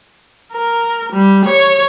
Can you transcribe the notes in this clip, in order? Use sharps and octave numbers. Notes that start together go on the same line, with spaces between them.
A#4
G3
C#5